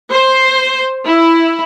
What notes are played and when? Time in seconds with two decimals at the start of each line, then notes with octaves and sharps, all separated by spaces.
0.10 C5
1.06 E4